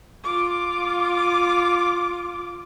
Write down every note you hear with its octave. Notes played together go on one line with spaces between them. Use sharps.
F4 D6